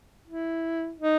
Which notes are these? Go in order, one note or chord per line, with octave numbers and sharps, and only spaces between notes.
E4
D#4